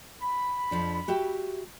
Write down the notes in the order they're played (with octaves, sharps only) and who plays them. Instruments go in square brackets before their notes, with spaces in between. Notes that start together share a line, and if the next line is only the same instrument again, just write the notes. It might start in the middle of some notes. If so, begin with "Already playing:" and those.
[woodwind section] B5
[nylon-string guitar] F2 F3 D4
F#4 G4 E5